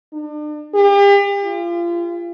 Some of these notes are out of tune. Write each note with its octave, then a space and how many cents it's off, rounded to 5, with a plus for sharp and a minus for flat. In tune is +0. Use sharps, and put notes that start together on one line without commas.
D4 +40
G4 +40
F4 -30